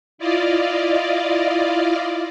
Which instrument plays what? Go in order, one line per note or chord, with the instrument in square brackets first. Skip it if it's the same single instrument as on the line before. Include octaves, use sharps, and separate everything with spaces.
[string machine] E4 F4 D5 D#5 F5